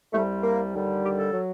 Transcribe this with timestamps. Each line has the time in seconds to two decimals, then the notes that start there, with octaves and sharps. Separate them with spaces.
0.12 C2 C3 G3 A3
0.43 A#3
0.73 D#2 D3 G3
1.03 G4
1.17 A4
1.32 F#3